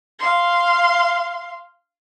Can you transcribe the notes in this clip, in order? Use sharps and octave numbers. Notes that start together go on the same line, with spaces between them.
F5 C6